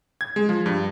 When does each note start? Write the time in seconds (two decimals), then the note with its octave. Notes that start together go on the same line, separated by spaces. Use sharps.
0.21 G#6
0.36 G#3
0.49 F3
0.66 G2